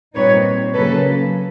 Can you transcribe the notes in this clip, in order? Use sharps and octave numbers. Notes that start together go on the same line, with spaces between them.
A#2 G3 C4 D#4 B4 C#5
C#3 F#3 A#3 C#4 A4 B4